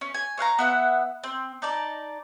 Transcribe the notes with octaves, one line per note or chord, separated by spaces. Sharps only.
C#4
G#5
C#5 F5 F#5 A#5
B3 E5 F#5
C4
D#4 D5 A5